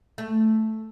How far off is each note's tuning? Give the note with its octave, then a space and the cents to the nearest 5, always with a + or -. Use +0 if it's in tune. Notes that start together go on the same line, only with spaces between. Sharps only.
A3 +0